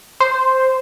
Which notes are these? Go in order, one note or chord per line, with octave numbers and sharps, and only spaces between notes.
C5